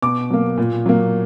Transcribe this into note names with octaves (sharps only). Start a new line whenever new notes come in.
B2 D6
F#3 A#3
A#2
F#3 A#3